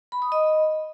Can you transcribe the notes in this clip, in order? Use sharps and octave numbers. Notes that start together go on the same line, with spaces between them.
B5
D#6
D#5